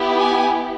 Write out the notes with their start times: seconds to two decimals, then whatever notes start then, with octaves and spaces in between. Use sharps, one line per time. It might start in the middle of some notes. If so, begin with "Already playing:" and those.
Already playing: B3 E4 G4
0.19 G#5